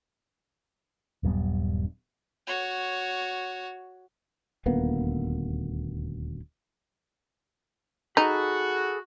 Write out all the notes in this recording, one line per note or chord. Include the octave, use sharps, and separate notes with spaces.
D#1 G2 F#3 B3
F#4 C#5
D#1 D2 A#3 B3
D#4 F#4 G#4 A4 B5